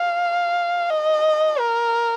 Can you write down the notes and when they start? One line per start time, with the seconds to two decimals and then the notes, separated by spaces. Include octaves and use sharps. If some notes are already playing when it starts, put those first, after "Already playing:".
Already playing: F5
0.90 D#5
1.60 A#4